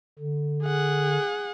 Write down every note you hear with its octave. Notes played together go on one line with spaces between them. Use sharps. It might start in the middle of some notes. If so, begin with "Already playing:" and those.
D3
G#4 F#5